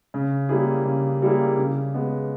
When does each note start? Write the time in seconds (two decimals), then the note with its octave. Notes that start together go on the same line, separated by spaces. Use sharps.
0.14 C#3
0.49 G3 A#3 E4 G#4
0.86 C#3
1.22 G3 A#3 E4 G#4
1.58 C#3
1.94 G#3 B3